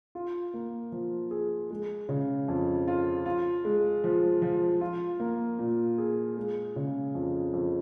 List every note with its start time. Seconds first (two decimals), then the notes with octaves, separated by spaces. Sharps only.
0.15 F4
0.54 A#3
0.92 F3
1.31 G#4
1.70 G#3
2.09 C#3
2.48 F2
2.88 F4
3.26 F4
3.65 G#3
4.04 F3
4.42 F3
4.81 F4
5.20 A#3
5.59 A#2
5.98 G#4
6.37 G#3
6.76 C#3
7.15 F2
7.53 F2